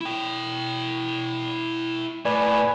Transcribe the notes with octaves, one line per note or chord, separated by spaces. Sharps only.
E4 G5
A2 B4 D5 G#5